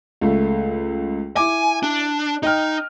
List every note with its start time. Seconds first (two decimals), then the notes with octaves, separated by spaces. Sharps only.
0.21 C#2 A3
1.36 E4 G#5 D6
1.83 D4
2.43 D#4 D#5 G5 F6